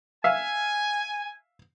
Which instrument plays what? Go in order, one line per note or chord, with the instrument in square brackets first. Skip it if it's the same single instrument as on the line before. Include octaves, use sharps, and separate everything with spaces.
[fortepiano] E5 F5 [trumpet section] G#5